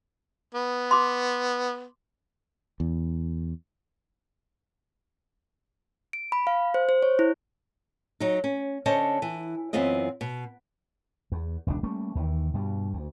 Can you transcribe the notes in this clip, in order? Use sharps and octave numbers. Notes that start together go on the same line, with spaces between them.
B3
C6 D6
E2
D7
B5
F5
C5
C5
C#5
E4
F#3 D#4
C#4
D3 C#4 C5 C#5 D#5 A5
E3
F#2 E3 B3 C4 F4 D#5
B2
E2
E1 C#2 D3 D4
G3 A3 A#3 C#4
D#2 D#3 E3
G2 B2 G3
D2